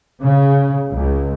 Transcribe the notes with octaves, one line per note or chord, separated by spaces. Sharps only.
C#3
C#2